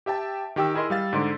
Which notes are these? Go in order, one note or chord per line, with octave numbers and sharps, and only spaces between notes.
G4 E5 G5 A5
D#3 G4 G5 E6
E4 G#4 A#4 D#5 C6
G3 F5 A6
G#2 D3 C6 D7